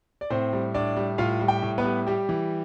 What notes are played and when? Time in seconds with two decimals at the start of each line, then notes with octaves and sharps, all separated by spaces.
0.21 D5
0.30 A2 C4 C5
0.53 G3
0.74 A2 D4 D5
0.97 G3
1.18 A2 F4 F5
1.41 G3
1.48 G4 G5
1.62 A2
1.78 B3 B4
1.84 G3
2.07 G3 G4
2.29 E3